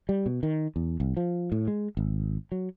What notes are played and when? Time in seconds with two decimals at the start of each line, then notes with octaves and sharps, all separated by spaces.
0.09 G3
0.26 B2
0.43 D#3
0.76 E2
1.00 C2
1.17 F3
1.52 A2
1.68 G#3
1.97 G#1
2.52 F#3